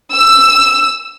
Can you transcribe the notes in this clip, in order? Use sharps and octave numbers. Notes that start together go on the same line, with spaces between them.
E6